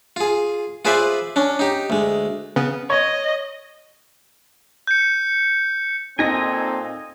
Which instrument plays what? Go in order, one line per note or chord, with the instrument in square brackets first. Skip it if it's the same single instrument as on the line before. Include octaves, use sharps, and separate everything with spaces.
[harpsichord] F4 G#4
F4 G#4 B4 C5 D5 E5
C#4 D4
D#4 G4
D2 G#3
[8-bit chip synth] C#3 B3
[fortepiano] C#5 [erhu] D#5
[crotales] G6 C#7
[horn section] A#2 C4 A4 [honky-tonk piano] D#4 A#6 [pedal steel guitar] D#5 G#5